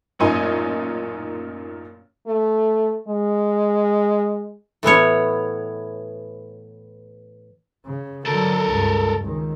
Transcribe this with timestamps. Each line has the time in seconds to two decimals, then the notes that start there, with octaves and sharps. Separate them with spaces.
0.19 A1 F#2 A#2 C#4 D#4 G#5
2.27 A3
3.08 G#3
4.83 A2 E3 B3 C#5
7.85 C#3
8.26 D3 F#3 A4 A#4
8.69 C#2 G2
9.22 C#2 D#3